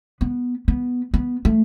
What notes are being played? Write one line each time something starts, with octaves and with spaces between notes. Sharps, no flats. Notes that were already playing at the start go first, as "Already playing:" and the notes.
B3
B3
B3
A3